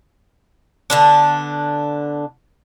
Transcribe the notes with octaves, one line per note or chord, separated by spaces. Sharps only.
D3 B3 D4